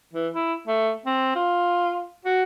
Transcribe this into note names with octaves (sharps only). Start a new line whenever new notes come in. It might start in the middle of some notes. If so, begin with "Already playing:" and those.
E3
E4
A3
C4
F4
F#4